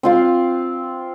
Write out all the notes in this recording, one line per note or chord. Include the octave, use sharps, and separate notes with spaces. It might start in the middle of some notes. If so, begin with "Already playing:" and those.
C4 F4 F5